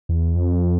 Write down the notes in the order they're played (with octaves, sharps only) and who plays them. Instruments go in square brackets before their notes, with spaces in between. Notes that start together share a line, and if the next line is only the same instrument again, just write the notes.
[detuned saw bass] E2
F2